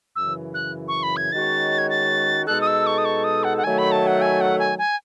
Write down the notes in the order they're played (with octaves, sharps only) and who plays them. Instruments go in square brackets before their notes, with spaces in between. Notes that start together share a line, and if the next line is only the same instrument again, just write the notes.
[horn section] F#2 C#3 E3 [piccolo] E6
[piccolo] F#6
C#6
B5
G#6
[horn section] D#3 G#3 C#4 F#4 C#5 [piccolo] A6
[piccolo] G#6
A6
[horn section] B2 G#3 D#4 A4 [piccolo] F#6
[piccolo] D#6
E6
C#6
D#6
C#6
D#6
F#5
F#5
[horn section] D#3 F#3 A3 [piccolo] G#5
[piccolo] B5
A5
F#5
G#5
F#5
G#5
G#5